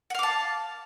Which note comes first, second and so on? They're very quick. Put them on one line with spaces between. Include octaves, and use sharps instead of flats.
F#5 F5 D6 A5